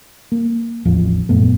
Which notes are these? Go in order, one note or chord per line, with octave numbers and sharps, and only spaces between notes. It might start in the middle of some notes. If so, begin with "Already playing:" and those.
A#3
A1 E2 F3
F#2 A#2 A3 B3